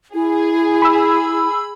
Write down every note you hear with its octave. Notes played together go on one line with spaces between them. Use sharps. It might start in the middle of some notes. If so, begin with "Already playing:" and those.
E4 G#4
B5 E6